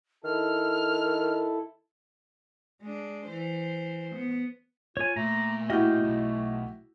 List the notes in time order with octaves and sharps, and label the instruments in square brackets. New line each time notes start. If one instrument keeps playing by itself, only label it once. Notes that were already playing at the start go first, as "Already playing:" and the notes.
[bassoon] D#3 [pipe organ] E4 A4 [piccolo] F6
[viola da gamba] G#3 D4
E3 C5
B3
[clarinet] F4 [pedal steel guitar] C#5 G#5
[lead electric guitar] A#2 [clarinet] A3 [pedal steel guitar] A#5
[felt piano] E4 F#4 G4 [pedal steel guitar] D#5 F6 G6
[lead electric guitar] B1